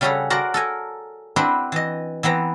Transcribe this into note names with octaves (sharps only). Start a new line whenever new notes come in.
C#3 G3 C#4 F#4 G#4 A4
F#4 A#4 C5 D5
A4 A#4 G#5
C4 D4 E4 F#4 B4 C5
E3 D#5
E3 B3 C4 A#5